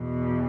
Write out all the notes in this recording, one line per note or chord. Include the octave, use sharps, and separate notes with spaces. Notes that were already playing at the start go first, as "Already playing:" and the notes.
Already playing: E2 B2